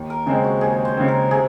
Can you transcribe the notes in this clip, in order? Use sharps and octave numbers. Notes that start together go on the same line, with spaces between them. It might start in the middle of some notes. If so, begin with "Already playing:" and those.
Already playing: D#2
A#4
C#3 G#3 C4 G#4
F#4
D#2 G#4
C5
C#3 G#3 C4
A#4
C3 G#4